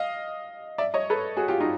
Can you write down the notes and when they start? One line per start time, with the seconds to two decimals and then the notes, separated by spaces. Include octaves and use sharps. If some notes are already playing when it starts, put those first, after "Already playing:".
Already playing: D#5 F5
0.78 D5 E5
0.94 C#5 D#5
1.10 A4 B4
1.37 F#4 G#4
1.48 F4 G4
1.61 D#4 F4